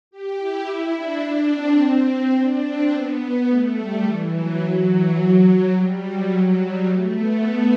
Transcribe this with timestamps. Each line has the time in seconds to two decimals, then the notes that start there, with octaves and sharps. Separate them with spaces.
0.11 G4
0.38 E4
0.95 D4
1.51 C4
2.36 D4
2.64 C4
2.91 B3
3.48 A3
3.76 G3
4.05 E3
4.32 F#3
4.60 F#3
4.88 E3
5.17 F#3
5.73 G3
6.01 F#3
6.57 G3
6.86 A3
7.14 B3